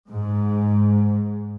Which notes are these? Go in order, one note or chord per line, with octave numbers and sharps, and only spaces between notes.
G#2